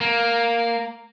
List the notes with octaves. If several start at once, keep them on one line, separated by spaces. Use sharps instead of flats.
A#3